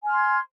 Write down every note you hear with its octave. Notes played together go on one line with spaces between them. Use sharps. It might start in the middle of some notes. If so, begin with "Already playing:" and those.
G#5 C6 F6 G#6